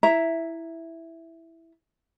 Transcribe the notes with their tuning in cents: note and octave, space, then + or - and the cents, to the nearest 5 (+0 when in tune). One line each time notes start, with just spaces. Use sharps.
E4 +0 E5 +0 A#5 +0